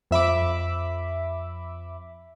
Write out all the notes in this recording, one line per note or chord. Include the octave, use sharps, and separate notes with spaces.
F2 E5 B5 D6